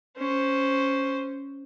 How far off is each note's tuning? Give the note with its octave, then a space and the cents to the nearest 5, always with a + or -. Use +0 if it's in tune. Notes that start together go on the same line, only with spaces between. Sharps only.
C#4 +0 C5 +0